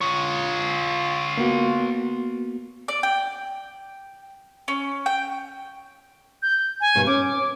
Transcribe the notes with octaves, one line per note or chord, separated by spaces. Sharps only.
F4 C#5
A#3 B3 F#4
D5
G5
C#4
G5
G6
G#5
G2 B2 D#3
C#4 D6